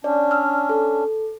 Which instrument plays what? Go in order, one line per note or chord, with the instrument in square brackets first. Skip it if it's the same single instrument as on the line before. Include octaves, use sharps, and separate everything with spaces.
[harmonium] C#4 D4 [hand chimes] D5
[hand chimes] E6 F6
A4